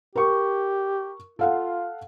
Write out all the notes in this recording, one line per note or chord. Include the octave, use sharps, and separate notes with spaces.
G4 A#4 C#6
F4 A4 F5 F#5